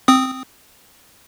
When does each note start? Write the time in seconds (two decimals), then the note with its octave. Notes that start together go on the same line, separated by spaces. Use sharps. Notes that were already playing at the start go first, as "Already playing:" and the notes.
0.08 C4 D#6